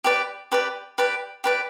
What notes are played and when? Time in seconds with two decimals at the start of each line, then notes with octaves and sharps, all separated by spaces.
0.04 G4 B4 D5
0.52 G4 B4 D5
0.98 G4 B4 D5
1.44 G4 B4 D5